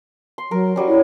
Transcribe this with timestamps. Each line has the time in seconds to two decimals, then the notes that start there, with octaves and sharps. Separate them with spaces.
0.38 C6
0.51 F#3 A#4
0.76 F#3 G3 C#4
0.88 E4